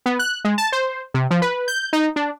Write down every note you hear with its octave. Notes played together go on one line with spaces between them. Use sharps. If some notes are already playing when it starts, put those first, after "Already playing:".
B3
F#6
G#3
A5
C5
C3
F3
B4
G6
D#4
D4